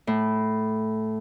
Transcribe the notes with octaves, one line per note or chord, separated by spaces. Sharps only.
A2